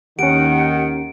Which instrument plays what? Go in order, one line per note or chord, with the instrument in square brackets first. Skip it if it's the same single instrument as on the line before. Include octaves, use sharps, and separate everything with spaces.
[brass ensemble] D#2 D#3 [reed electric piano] C#4 G4 [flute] F#5 [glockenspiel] D7